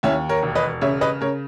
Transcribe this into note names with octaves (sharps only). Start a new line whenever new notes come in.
D#2 C#4 E4
A#4 C#5
E1
B4 D#5
C#3 C#5 E5
B4 D#5
C#3 A#4 C#5